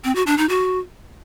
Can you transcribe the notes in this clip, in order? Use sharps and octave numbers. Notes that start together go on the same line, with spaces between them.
C4
F#4
D4
D#4
F#4